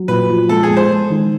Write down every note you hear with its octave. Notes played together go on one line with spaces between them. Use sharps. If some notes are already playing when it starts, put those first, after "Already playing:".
Already playing: F#3
A#2 B4
F3
G#3 A4
G#4
G#3
C5
G#3
D#3